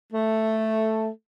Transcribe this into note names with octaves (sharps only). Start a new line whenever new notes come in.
A3